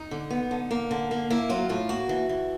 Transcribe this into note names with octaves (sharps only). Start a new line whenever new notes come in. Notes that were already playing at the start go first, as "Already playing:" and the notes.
Already playing: D#4
D3
B3
D3
A#3
D3
A#3
A#3 E4
F#3 F4
A2 F4
A#3 F#4
E3
E3